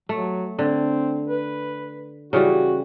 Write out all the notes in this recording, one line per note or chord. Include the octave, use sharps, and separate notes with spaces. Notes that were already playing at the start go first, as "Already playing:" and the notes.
F#3 A3
D3 C4
B4
C#3 E3 G3 F#4